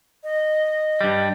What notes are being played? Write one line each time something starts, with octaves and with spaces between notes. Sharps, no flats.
D#5
G2 G3